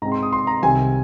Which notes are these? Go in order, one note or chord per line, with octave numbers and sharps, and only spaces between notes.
G#2 G#3 C4 A#5
C6
D#6
C6
A#5
C2 C3 D#3 C4 G#5